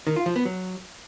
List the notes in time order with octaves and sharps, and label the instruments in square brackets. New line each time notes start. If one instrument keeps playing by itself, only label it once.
[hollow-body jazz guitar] D#3
F4
F3
B3
F#3